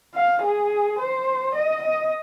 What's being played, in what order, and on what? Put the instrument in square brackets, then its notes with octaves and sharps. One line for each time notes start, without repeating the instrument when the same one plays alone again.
[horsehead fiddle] F5
G#4
C5
D#5
D#5